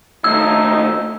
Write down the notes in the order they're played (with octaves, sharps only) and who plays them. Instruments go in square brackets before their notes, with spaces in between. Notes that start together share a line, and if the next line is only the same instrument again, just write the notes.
[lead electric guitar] D#2 A3 [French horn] D#4 [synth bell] E6